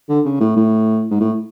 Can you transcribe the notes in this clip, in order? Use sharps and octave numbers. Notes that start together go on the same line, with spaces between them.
D3
C#3
A2
A2
G#2
A2